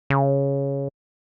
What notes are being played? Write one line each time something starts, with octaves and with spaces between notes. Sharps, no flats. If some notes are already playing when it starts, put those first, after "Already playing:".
C#3